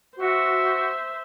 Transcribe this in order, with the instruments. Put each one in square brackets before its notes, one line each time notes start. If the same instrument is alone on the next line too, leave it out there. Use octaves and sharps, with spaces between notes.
[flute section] F#4 [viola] C5 E5